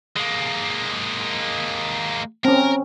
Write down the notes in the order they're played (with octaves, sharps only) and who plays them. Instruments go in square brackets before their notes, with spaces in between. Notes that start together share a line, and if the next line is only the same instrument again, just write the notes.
[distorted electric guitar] G#3 A#3
[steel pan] C4 C#4 [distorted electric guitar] A#4